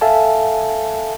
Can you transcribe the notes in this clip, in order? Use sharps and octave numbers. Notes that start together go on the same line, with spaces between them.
A4 E5 F5 G#5 A5